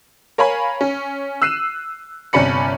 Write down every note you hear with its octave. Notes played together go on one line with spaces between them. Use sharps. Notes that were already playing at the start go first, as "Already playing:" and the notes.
A#4 C#5 F5 G#5 B5
C#4
E6 F#6 C7 D#7 E7
G1 C3 C#4 D5 B5 C#7